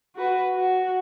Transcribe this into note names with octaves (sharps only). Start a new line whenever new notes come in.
F#4 B4
F#4